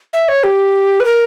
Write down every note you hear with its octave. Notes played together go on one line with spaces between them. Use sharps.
E5
C#5
G4
B4
A#4